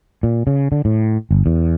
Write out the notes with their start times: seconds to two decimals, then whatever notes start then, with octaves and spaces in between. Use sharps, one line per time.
0.23 A#2
0.47 C#3
0.72 D3
0.85 A2
1.31 G1
1.46 E2